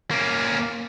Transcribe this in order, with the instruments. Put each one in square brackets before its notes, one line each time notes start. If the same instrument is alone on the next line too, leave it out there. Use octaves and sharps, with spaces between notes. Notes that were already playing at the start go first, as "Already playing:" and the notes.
[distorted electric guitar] A#3 C#4